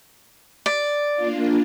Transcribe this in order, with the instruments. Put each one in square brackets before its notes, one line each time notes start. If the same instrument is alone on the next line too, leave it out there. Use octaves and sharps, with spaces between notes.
[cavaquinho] D5
[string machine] A#3 D4 F4